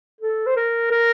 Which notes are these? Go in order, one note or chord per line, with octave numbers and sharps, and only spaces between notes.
A4
C5
A#4
A#4